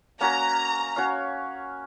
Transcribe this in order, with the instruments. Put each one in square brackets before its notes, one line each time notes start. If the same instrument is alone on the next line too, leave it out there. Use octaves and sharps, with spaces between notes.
[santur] A#3 C#4 F#4 A#4 [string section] A#5
[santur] C#4 F#4 C#5 F5